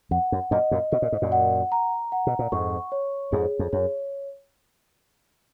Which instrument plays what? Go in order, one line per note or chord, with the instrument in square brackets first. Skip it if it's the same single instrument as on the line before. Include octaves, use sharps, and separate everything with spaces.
[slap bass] F2 [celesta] F#5
[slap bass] F#2
[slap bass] F#2 A#2 [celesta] D#5
[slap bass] F#2 A#2
[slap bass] B2 [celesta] D#5
[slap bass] A#2
G#2
F#2 A#2
[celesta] F#5
A#5
F#5
[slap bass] B2
A#2
[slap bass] F2 G#2 [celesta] C#6
[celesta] C#5
[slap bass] F2 G#2 [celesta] G#4
[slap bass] F2
[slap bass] F#2 [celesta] C#5